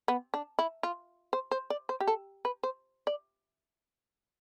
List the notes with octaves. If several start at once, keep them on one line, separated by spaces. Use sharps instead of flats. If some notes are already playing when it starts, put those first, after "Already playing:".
B3
D4
E4
F4
C5
C5
D5
C5
G4
A4
B4
C5
D5